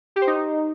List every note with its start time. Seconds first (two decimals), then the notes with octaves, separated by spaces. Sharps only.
0.16 G4
0.22 C5
0.27 D#4